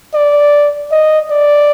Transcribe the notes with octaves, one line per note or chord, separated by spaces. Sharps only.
D5
D#5
D5